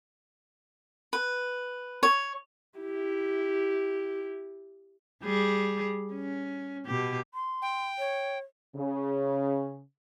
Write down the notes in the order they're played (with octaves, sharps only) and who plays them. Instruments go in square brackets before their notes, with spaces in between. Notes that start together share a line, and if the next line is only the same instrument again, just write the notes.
[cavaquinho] B4
C#5
[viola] E4 G4
[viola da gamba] G3 G#4
C#4
B2 G4
[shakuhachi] C6
[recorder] G5
[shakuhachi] C#5
[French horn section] C#3